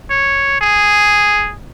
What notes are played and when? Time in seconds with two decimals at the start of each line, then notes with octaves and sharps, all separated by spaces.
0.10 C#5
0.61 G#4